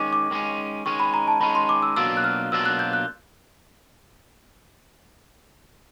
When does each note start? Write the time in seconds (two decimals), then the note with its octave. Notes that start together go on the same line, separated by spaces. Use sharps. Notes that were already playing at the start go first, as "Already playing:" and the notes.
Already playing: D#3 G#3 C#4 C#6 D6
0.13 D6
0.31 D#3 G#3 C#4
0.86 D#3 G#3 C#4 C#6
1.00 B5
1.14 A#5
1.27 A5
1.41 D#3 G#3 C#4 B5
1.55 C6
1.69 D6
1.82 E6
1.96 B2 F#3 A#3 D4 F4 E6
2.17 F#6
2.24 F6
2.52 B2 F#3 A#3 D4 F4 E6
2.65 F#6
2.79 G6
2.93 F#6